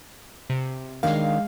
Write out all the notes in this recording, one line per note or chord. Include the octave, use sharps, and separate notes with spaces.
C3
D#3 G#3 D4 A#4 F5